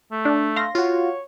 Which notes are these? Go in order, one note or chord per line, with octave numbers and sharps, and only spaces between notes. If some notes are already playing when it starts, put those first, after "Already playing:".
A3
D4
F5 C6 A#6
F4 F#4 C#5